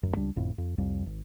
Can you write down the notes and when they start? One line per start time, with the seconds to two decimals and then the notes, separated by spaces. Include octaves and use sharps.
0.03 D1 F#2
0.16 C#2 G3 D4
0.36 G1 F2 A2
0.58 F2
0.78 C2 F2 G3
1.06 G#1